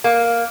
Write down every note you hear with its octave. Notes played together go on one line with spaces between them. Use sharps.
A#3